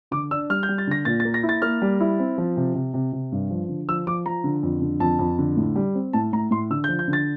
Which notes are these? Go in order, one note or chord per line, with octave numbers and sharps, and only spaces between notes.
D3 D6
D4 E6
G3 F6
G6
G3
A6
D3 A#6
A#2 A6
A6
A#3
A#6
E4
A6
A#3 F6
G3
E4
C4
F3
C3
C3
C3
C3
G2
F3
D3
F3 E6
F3 D6
F3 A#5
D3
F2
D3
F2 A5
F2
D3
A2
G3
C4
A2 A5
A2 A#5
A2 C6
D3 E6
G6
F3
G6
D3
A6